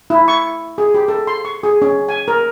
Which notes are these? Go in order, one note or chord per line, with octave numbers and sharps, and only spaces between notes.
E4
C#6
G#4
G4
A4
C6
C#6
G#4
C#4
G#5
A#4